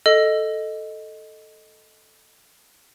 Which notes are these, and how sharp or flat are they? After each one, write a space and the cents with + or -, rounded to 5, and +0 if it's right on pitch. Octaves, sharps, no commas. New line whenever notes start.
A4 +0 D#5 +0